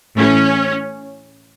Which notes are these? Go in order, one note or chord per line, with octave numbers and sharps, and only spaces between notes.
A2 E3 C#4